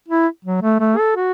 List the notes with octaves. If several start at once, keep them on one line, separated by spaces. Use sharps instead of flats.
E4
F#3
A3
A3
A4
F#4